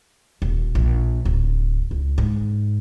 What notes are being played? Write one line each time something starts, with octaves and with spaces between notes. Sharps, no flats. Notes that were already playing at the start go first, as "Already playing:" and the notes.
D#1
A#1
D1
C#2
G#2